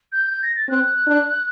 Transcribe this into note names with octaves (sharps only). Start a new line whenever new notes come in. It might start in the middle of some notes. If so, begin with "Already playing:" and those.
G6
G6
A#6
A6
C4 F#6
D4